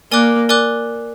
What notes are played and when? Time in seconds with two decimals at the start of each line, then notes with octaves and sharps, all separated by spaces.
0.11 A#3 A#4 D5 G#5 D6 F#6
0.49 A#4 D5 G#5 D6 F#6